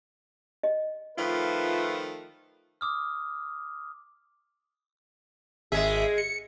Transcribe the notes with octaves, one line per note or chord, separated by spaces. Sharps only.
D#5
D#3 F3 A3 F4 B4
D6 D#6 F6
G#1 G#3 G#4 E5
C#7